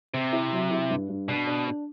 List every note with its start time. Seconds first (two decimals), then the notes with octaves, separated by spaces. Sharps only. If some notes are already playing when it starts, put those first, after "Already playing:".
0.13 C3 C4
0.32 E4
0.52 F#3
0.71 E4
0.90 G2
1.09 G2
1.28 B2 D4
1.47 D4
1.67 D4